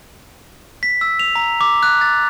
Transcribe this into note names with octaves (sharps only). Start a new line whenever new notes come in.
B6
E6
F7
A#5
D6
F#6
A6